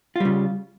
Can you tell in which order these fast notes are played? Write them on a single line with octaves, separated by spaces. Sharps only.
F4 G3 C#3